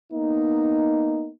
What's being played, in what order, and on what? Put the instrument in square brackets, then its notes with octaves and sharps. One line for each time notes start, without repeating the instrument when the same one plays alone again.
[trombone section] A#3 B3 D#4